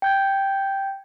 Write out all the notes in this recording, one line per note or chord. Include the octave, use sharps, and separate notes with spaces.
G5 G6 G#6